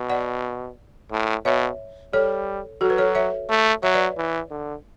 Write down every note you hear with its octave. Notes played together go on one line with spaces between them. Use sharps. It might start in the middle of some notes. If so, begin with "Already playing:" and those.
Already playing: B2
D5 F#5
A2
B2 C#5 E5
G3 A4 C#5
F#3 F#4 A4
B4
A4 C#5
C#5 E5
A3
F#3 C#5 E5
B4 D5
E3
D3